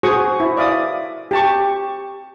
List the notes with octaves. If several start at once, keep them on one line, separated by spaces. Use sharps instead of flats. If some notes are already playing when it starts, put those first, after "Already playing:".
F#4 G#4 C5 C#6 D#6
E4
D5 E5 F5 D#6
G4 A5 C#6